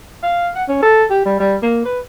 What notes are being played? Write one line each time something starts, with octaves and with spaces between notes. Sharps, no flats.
F5
F#5
C#4
A4
G4
G3
G3
A#3
B4